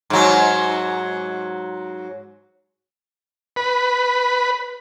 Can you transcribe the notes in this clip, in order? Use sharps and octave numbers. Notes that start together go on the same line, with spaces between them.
G#2 F#3
B4